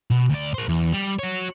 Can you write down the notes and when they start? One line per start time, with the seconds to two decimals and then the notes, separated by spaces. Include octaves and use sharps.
0.11 B2
0.30 D2 D5
0.54 A#4 C5
0.69 E2
0.93 G3
1.19 F#4 C#5